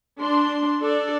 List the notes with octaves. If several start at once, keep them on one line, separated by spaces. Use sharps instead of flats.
D4 C6
D4 A4 D5